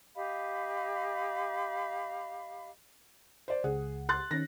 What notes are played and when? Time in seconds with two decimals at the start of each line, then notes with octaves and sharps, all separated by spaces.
0.15 G4 D#5 F5 B5
3.48 C5 D5
3.64 C#2 G#4 F#5
4.09 C6 F#6 A6
4.31 D#3 C#4 A#6